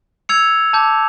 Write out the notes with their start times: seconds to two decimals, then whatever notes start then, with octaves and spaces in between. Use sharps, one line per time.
0.29 E6 G#6 C#7 F7
0.73 A5 D6 G6